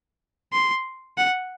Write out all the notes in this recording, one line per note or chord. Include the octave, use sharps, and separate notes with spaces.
C6
F#5